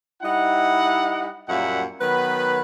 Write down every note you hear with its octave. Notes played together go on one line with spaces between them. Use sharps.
G3 D#4 E4 D#5 F#5
F#2 A#2 G3 A#3 E5 F#5
D#3 F#3 B3 B4